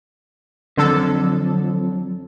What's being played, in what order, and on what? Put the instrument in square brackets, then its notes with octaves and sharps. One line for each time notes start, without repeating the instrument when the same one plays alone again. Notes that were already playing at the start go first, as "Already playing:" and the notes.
[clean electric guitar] F2 [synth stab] D3 A4 [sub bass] F#3